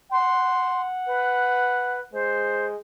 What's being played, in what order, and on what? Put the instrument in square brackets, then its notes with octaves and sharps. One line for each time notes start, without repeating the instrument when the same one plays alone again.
[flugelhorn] F#5 [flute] C6
[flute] B4
[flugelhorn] G#3 [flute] C5